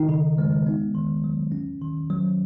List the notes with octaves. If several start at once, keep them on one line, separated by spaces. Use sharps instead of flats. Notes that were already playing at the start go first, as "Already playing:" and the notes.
Already playing: D#3 D#4
C#3
G#3
B3
D#3
F#3
C#4
D#3
F#3